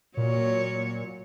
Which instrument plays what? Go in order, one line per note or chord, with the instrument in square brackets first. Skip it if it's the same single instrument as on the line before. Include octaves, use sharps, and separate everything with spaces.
[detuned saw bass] A#2 [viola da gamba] F#3 C#5